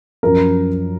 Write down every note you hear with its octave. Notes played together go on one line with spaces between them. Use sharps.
F#2 F3 A#4